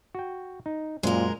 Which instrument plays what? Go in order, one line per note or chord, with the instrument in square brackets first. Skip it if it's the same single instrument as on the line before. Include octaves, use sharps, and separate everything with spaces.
[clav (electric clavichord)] F#4 G5
D#4
[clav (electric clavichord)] F#2 C5 [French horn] A#2 [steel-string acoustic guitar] G#3 A#4